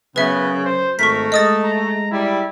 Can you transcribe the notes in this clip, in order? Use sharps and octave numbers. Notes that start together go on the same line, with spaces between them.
F#2 C#3 B3 B4 E5
C5
G#1 A3 A#4 C#6 B6
G#3 D#5 D#6 A6
A#5
G3 E4